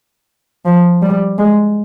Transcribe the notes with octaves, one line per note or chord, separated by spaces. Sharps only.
F3
G3
G#3